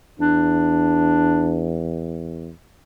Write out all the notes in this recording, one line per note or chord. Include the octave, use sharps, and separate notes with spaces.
E2 D4